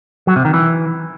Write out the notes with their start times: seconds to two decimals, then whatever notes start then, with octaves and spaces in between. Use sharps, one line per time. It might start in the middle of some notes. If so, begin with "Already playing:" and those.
0.27 F#3
0.36 C3
0.45 D#3
0.54 E3